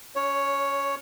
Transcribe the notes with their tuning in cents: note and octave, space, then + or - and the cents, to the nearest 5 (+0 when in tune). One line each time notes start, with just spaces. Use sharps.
C#4 +25 C#5 +0